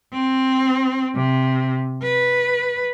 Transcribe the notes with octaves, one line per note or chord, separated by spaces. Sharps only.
C4
C3
B4